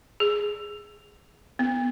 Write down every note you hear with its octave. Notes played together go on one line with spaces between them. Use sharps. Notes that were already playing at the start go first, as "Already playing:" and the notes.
G#4
B3